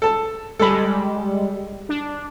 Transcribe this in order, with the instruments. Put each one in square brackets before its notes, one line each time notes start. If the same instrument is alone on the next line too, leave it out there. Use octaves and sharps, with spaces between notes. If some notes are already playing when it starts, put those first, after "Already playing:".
[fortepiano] A4 A5
[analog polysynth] G3 G#3 [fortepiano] A4 B5
[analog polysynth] D4